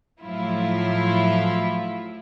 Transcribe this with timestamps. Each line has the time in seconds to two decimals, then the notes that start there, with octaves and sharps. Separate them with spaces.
0.22 A2 F3 F#3 E4 F4